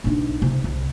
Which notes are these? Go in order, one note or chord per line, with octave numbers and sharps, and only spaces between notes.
B1 D4
C3
C2